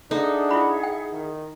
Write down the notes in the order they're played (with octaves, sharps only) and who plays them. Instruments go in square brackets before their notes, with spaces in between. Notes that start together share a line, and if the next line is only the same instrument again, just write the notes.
[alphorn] D4 [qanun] D#4 [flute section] G#4 E5 F#5 [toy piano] A4 A#5
[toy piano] E4 F4 B5
G5
[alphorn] D#3